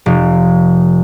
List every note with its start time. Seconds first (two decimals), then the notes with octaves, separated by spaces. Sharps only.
0.06 F1